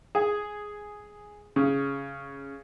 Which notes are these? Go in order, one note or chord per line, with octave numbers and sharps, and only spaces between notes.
G#4
C#3